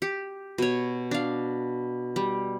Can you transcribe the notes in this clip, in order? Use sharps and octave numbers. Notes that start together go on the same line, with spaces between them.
G4
B2 C#5
D4 F5
G3